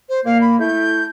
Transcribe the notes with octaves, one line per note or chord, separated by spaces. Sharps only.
C5
A#2 A#3 F5
B5
A3 E4 G6